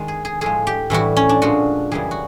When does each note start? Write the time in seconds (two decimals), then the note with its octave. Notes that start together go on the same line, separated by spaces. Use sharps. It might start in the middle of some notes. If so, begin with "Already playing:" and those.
Already playing: D#3 G#3
0.08 G#4
0.25 G#4
0.41 A2 F3 G#3 G#4
0.67 G4
0.90 A2 E3 G3 F#4
1.17 C#4
1.29 D4
1.42 A#2 F3 G#3 F#4
1.92 F#2 C#3 E3 G3 G#4
2.11 F#4